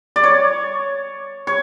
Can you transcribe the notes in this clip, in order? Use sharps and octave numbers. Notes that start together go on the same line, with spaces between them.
D5
C#5
C#5